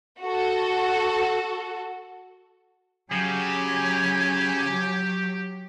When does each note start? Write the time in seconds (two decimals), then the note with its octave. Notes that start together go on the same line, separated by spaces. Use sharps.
0.21 F#4 A4
3.11 C#3 F#3 G4 G#5